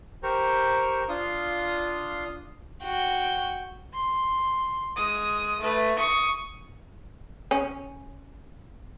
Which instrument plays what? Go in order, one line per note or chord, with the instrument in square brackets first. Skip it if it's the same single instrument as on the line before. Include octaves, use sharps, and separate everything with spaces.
[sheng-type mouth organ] G4 A#4 C5 G5 A#5 C#6
D4 F4 F5 C6 D#6
[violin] F#4 G5
[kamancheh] C6
G#3 D#6
A3 B4
C#6 D#6
[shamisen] C#4